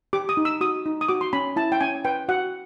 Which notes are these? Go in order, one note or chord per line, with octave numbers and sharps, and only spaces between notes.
G4 D6
D#6
D#4
E6
F#4 D#6
D#4
D#6
F#4 D6
C6
C#4 B5
E4 A5
G5
C#4 G#5
B4 G5
F#4 F#5